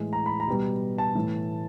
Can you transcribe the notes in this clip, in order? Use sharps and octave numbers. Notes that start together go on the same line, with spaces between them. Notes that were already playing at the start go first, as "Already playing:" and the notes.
Already playing: A2 E3 G#3
A#5
B5
A#5
B2 G3 B3
A5
A2 E3 A3